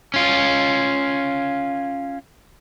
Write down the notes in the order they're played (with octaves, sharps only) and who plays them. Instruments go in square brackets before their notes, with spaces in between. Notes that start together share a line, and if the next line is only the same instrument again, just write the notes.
[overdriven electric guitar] C#4 F4